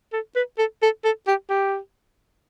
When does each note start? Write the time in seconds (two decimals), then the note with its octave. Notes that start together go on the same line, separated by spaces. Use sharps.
0.13 A4
0.35 B4
0.58 A4
0.82 A4
1.04 A4
1.27 G4
1.49 G4